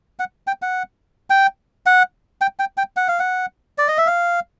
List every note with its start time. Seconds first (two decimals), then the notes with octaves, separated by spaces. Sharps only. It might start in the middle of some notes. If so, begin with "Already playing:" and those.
0.19 F#5
0.47 G5
0.62 F#5
1.30 G5
1.86 F#5
2.41 G5
2.59 G5
2.77 G5
2.97 F#5
3.08 F5
3.19 F#5
3.78 D5
3.88 D#5
3.98 E5
4.07 F5